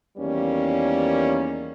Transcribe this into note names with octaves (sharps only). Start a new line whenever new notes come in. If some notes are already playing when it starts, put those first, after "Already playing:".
E2 D#3 G3 A#3 C#4